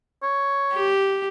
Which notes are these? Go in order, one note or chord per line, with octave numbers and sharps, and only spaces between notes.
C#5
G4